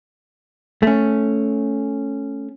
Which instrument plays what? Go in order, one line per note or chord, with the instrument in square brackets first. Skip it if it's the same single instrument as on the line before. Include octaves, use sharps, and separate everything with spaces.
[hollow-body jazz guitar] A3 C#4